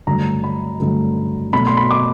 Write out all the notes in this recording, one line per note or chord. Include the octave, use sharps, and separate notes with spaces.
G2 D3 F#3 A3 A#5
B5
G2 D3 F#3 A3
B2 F#3 A3 B5
C6
B5
D6